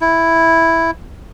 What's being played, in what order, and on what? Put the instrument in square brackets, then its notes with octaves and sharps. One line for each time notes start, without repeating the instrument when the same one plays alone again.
[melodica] E4